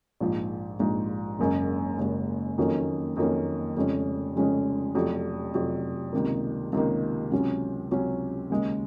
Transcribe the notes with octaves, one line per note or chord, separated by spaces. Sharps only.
A#1 G#2 F3
A#1 G#2 F3
F#1 F#2 C#3 G#3
F#1 F#2 C#3 G#3
F2 D#3 F#3 A#3 C#4
F2 D#3 F#3 A#3 C#4
F1 F2 C#3 G#3 C#4
F1 F2 C#3 G#3 C#4
F1 F2 C3 F#3
F1 F2 C3 F#3
C#2 C3 D#3 A#3
C#2 C3 D#3 A#3
C#2 C3 F#3 C#4
C#2 C3 F#3 C#4
D#2 C#3 G#3